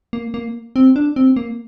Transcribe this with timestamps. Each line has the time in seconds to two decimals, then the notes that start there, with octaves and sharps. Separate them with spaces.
0.13 A#3
0.34 A#3
0.76 C4
0.96 D4
1.16 C4
1.36 A#3